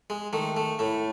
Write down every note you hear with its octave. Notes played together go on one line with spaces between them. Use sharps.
G#3
D#3 A3
A3
A2 A3